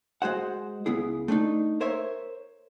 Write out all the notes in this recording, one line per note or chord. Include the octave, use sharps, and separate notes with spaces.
G#3 F#4 C5 F#5
C#2 B3 E4 G#4
A3 C4 D4 D#4
A#4 C5 C#5 E5